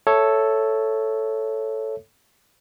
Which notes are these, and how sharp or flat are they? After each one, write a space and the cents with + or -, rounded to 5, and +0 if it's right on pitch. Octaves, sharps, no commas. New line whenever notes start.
A4 +0 C#5 +0 E5 +0